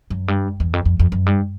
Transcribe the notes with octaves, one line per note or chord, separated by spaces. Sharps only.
F#2
G2
E2
F2
F2
F2
F#2
G2